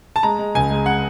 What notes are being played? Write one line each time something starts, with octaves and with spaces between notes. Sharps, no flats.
A5
G#3 A#5
G#3
C#2 G#5
G#3
G#3 F#5